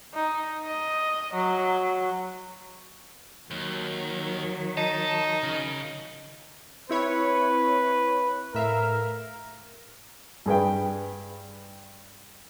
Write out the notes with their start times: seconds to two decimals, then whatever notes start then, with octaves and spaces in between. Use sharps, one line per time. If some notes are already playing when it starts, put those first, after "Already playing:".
0.14 D#4
0.65 D#5
1.33 F#3
3.51 D#2 D#3 F#3
4.77 D#4 A5
5.43 C#3
6.89 C4 E4 B4 C#5
8.54 A2 A#4 E5 F5
10.46 G2 G#4 B4 G5